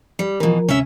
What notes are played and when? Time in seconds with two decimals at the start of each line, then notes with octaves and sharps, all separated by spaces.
0.19 G3
0.40 B2 E3 F3 A#4
0.69 D2 C3 C#4 A#4 E5